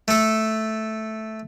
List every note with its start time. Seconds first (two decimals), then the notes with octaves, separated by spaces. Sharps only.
0.08 A3 A4